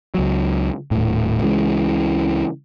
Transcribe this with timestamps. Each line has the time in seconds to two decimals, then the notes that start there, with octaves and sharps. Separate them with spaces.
0.15 C#2 F#3
0.91 D#1 A2
1.41 C#2 C#3 E3 G#3